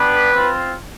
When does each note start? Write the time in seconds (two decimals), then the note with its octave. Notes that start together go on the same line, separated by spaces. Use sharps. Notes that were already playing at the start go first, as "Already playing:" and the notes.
Already playing: B3 D4 G4 B4
0.32 C4 F4